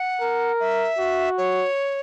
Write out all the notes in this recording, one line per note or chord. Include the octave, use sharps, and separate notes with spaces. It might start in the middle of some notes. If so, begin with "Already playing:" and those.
Already playing: F#5
A#4
E5
F#4
C#5